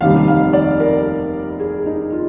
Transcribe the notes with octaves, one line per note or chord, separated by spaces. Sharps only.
F1 D#2 D#3 G3 F5
F5
D5
A#4
G#4
D#4
F4